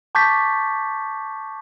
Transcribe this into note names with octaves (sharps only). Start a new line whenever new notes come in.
A5 C#6 D6 G6 A6 B6